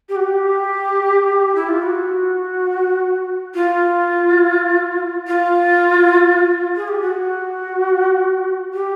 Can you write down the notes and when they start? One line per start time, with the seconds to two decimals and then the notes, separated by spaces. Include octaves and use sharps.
0.09 G4
0.16 F#4
0.23 G4
1.55 E4
1.69 F4
1.82 F#4
3.55 F4
5.27 F4
6.76 G#4
6.88 G4
7.01 F#4
8.74 G4